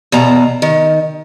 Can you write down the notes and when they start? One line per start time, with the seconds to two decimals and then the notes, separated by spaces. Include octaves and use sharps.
0.12 E2 B2 A#5
0.62 D#3